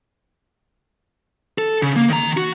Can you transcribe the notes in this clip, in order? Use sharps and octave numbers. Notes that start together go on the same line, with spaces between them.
A4
C#3
A#3
D#3 A#5
F#4